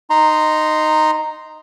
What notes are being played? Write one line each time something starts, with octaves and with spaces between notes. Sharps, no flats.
D#4 A#5 C6